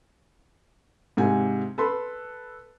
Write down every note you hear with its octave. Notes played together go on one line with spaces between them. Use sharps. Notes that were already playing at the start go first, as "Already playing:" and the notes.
G#2 C3 G#5
A4 B4 B5 C6